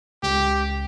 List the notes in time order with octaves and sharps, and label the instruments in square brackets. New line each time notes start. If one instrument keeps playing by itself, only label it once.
[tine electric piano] C#2 [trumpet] G4